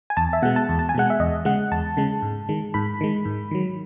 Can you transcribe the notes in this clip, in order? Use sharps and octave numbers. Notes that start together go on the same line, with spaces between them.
G#5
E2 A5
E5
B2 G#3 F#5
A5
E2
A5
G#5
B2 G#3 F#5
E5
E2 D#5
C#3 G#3 F#5
E2 A5
C#3 G#3
G#2
D#3 G#3
G#2 B5
D#3 G#3
G#2
D#3 F#3